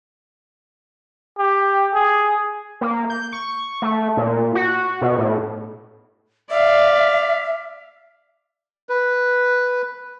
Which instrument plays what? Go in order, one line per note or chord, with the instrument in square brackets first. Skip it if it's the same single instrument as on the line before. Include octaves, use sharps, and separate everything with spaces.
[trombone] G4
G#4
[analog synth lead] A#3
G6
C#6
A3
A#2
F#4
B2
A2
[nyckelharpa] D5 F5 [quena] E5
[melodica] B4